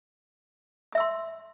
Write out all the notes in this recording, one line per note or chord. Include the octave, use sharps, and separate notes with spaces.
E5 C6 D#6 E6